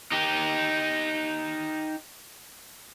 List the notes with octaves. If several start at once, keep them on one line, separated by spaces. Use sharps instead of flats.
D#4 G4